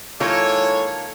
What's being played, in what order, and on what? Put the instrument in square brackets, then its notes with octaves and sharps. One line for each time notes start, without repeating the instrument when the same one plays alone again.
[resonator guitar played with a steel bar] D#3 A#3 F4 [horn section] G#3 E4 C#5 [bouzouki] A4